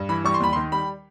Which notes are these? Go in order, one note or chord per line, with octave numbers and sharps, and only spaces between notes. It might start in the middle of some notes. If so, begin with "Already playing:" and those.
Already playing: G2
E3 B5
G3 C#6
C6
D#2 B5
C6
D#3
G3 B5